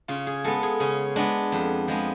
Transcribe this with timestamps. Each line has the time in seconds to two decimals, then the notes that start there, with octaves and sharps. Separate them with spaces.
0.08 C#3 F4
0.27 G#4
0.44 G#3 B3 A4
0.63 G#4
0.80 C#3 C#4
1.16 G#3 B3 D4
1.52 F2
1.88 F3 G#3 B3